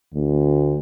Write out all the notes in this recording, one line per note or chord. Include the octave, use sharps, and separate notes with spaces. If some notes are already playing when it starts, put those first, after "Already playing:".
D2